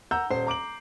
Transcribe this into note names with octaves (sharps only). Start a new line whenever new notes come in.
F#5 A#5 E6 G6
D#1 C5 C7
A#5 D6 D7 F#7